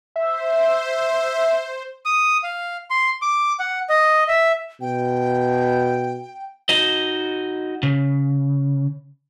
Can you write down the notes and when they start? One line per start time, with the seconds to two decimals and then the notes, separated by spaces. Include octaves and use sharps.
0.16 C5 E5
2.06 D#6
2.43 F5
2.90 C6
3.22 D6
3.60 F#5
3.89 D#5
4.28 E5
4.81 B2 G5
6.69 D#4 F#4 D#5
7.83 C#3